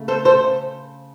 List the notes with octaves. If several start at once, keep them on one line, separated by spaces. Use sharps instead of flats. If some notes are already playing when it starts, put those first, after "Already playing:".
Already playing: C#3 A3
A4 C5
A4 C5
C#3